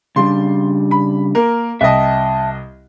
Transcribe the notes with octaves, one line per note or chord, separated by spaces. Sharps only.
C#3 G3 D4 C6
B5
A#3 A#4
C2 D#5 E5 G5 A5